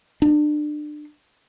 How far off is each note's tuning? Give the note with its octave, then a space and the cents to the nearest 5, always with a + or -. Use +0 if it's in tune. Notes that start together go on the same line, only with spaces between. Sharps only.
D4 +30